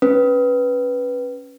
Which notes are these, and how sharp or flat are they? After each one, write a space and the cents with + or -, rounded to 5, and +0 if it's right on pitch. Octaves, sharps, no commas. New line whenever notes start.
C#4 +0 B4 +0